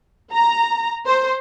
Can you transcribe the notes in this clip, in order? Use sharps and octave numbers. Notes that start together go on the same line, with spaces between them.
A#5
C5